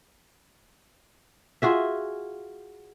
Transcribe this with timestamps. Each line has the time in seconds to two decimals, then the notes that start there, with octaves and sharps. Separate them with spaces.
1.62 F4 F#4 G#4 E5